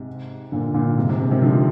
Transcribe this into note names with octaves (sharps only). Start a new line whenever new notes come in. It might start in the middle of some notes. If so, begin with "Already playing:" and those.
Already playing: G#2 C3
A#2 D3
A#2 D3
G#2 C3
G#2 C3
G#2 C3
C3 D#3
D3 F3